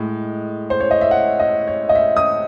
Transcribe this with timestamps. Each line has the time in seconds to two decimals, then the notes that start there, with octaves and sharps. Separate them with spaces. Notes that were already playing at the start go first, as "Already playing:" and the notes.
Already playing: A2 G#3
0.70 C5
0.80 C#5
0.91 D#5
1.01 E5
1.11 F#5
1.40 D#5
1.67 C#5
1.89 D#5
1.95 E5
2.16 D#6